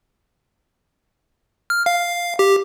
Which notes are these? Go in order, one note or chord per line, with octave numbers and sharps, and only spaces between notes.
F6
F5
G4